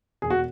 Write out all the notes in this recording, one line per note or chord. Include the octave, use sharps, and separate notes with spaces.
E1 G#4
F#4